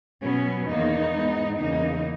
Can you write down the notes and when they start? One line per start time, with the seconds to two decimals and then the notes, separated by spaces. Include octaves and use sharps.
0.22 B2 F#3 B3 C#4
0.68 E2 D#3 A#3 D#4
1.14 G#2 E3 G#3 B3
1.59 E2 C#3 E3 A#3 D#4